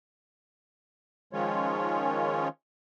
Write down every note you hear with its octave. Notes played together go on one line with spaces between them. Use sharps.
D#3 F3 G#3 C#4 F4 C#5